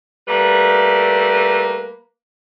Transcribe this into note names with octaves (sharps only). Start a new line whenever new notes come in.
G3 A3 A#3 B4